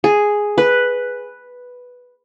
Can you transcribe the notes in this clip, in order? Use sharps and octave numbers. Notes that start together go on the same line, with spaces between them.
G#4
B4